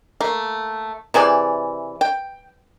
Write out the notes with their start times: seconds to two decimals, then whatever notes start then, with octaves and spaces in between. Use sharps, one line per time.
0.21 A3 A#3
1.14 C3 E3 G#4 D5
2.01 G5